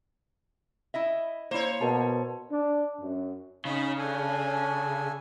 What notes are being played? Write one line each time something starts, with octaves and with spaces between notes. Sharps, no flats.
E4 D#5 E5
A#3 E4 C5 C#5
B2 A#4 A5
D4
F#2
C#3 C#4 D#4 B5
D4 A4 G#5